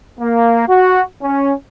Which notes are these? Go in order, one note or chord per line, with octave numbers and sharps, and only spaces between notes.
A#3
F#4
C#4